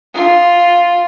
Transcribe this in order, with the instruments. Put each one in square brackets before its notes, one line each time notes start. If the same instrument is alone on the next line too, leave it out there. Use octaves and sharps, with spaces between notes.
[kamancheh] F4